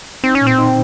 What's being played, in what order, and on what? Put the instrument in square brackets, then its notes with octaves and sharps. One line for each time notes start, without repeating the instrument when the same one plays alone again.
[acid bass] C4 [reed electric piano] D#4
[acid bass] C#4
[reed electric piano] A#2
[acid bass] C4
[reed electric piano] D#4